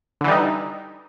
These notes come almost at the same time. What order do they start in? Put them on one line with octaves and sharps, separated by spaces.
D3 E3 G3 D#4